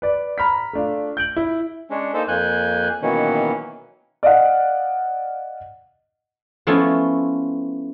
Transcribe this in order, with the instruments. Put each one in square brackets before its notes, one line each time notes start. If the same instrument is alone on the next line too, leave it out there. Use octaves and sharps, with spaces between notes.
[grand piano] B4 D5
A#5 B5 F6 B6
A3 D4 F4
G6 D7 F#7
E4
[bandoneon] G#3 C#4 D4
A#3 D#4 A4 C5
F2 A#3 G#5 F#6 G6
B2 D#3 E3 F#3 A#3 C#4
[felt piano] D5 D#5 F5 F#5
[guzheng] F3 A3 B3 C#4 E4 F4